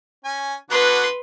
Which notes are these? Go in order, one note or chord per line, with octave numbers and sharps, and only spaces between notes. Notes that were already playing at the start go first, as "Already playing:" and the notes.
C#4 G#5
D3 B3 F#4 B4 C6